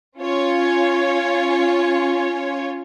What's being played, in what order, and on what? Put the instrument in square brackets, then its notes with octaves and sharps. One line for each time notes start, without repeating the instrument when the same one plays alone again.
[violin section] C#4 F4 C#5